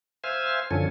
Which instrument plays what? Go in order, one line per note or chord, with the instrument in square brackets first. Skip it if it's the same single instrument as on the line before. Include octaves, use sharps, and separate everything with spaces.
[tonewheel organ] C5 E5 F5 G#5
F#2 D3 F3 C#4 A4 G#5